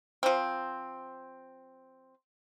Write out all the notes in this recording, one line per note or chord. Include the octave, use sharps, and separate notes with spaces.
F3 C4